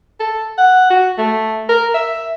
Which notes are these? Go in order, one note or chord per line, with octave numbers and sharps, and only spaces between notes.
A4
F#5
F#4
A3
A#4
E5